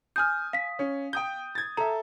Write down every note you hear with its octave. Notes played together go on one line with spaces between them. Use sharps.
G#5 D#6 F6 G6
F5 B6
C#4
G5 D#6 G6
G#6 A6
A4 E5 A#5